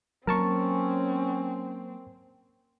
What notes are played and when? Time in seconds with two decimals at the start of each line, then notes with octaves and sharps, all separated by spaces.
0.27 F#3 A#3 C4 C#4 A#4 A5 C#6